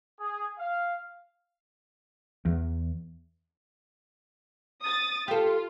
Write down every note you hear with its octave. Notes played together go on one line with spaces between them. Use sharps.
G#4
F5
E2
D#6 A6
F4 G4 A4